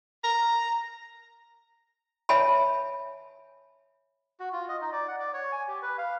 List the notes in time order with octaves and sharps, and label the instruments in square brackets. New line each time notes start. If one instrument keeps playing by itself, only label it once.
[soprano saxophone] A#5
[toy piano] C#5 E5 G#5 A5 B5
[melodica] F#4
F4
D#5
D#4
D5
F#5
D5
C#5
G#5
G4
B4
F5